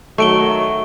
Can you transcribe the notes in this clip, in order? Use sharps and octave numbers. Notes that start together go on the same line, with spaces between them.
D#3 F#3 A3 C#6 D7 G7